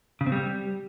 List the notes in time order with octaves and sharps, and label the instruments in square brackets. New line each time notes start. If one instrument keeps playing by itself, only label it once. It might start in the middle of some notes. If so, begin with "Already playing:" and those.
[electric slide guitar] C#3
C4
G3